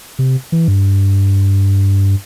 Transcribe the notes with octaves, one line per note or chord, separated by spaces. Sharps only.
C3
E3
G2